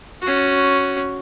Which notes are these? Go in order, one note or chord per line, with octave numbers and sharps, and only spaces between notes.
C#4 F#4